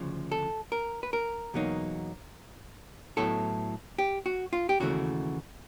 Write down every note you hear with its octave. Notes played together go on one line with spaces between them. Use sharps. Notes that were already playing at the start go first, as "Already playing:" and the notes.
Already playing: D2 C#3 F3
A4
A#4
B4
A#4
E2 B2 F#3 A#3 D#4
A2 F#3 B3 E4 A4
G4
F#4
F4
G4
D#2 C#3 E3 A3 F#4